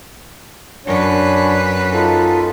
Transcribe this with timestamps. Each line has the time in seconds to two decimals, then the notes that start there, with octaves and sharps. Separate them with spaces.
0.86 F#2 D4 B4 C#5
1.93 D#4 F4 A4